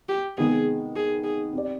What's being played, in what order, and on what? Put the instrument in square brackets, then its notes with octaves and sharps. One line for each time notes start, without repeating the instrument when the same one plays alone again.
[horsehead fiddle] G4
[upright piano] C3 D#3 G#3 B3 [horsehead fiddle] G#4
[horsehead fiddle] G#4
G#4
[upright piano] C4 G4 D5